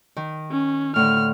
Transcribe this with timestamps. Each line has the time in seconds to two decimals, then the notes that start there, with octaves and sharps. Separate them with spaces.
0.17 D#3
0.51 C#4
0.96 A2 D3 F6